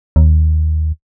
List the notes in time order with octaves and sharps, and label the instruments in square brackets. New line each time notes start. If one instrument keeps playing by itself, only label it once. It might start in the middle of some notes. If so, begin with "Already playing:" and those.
[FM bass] D#2